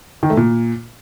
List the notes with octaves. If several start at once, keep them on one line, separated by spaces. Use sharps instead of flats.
D#3
A3
A#2